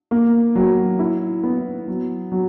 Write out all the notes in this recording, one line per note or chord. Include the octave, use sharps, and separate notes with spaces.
A#3
F#3
E4
B3
F#3
F#3